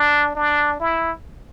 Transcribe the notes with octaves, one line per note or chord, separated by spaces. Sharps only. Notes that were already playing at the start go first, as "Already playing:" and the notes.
Already playing: D4
D4
E4